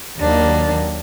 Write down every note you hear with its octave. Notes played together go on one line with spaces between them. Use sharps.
D#2 D#3 F#3 A#3 D4